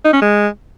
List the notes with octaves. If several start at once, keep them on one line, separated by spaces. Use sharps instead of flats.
D#4
C#4
G#3